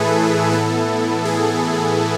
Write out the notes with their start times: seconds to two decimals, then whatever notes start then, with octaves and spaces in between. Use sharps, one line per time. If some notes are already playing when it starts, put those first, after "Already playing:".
Already playing: A2 E3 A3 E4 G#4 A4 B4
0.52 A2 E3 B3 E4 A4
1.25 G#4